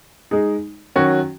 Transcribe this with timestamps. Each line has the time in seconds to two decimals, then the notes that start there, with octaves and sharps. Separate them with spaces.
0.31 G#3 D#4 G#4
0.96 D#3 F#3 C#4 F#4